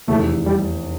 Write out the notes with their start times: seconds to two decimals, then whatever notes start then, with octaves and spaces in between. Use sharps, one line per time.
0.07 F1 E2 C3 A3
0.46 G3